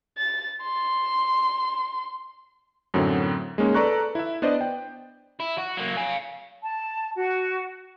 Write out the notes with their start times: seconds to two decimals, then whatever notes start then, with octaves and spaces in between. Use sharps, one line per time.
0.18 A6
0.63 C6
2.94 F#2 A2 D3 F#3 C4
3.58 G#3 A#3 C#4 D#4
3.74 A4 B4 D5 A#5 C#6 F#6
4.15 E4 E5
4.42 B3 D4 C5 D5 D#5
4.61 G5
5.40 E4
5.58 F#4
5.78 F#3 A#3
5.97 F5 G#5
6.62 A5
7.16 F#4